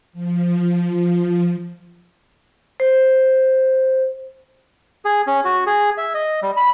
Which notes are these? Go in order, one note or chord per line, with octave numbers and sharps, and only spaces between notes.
F3
C5
G#4
C#4
F#4
G#4
E5
D#5
G3
B5